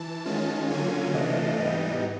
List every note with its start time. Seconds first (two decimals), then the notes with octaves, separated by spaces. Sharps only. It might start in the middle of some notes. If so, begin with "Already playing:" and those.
Already playing: E3 A5
0.26 D#3 G#3 C#4 F4
0.70 D3 F#3 A#3 C#4 F4 G#5
1.14 C3 E3 A3 D4 F4 D#5
1.59 G#2 E3 G3 B3 D#4